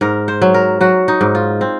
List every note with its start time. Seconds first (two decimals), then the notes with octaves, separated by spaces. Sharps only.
0.01 G#2 A#4
0.28 C5
0.42 F#3
0.54 A#4
0.81 F#3 F#4
1.08 D#4
1.21 G#2
1.35 F4
1.61 C4